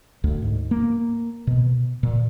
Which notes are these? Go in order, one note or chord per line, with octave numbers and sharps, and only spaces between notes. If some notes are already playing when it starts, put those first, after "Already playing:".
D2
G#2
A#3
B2
A#2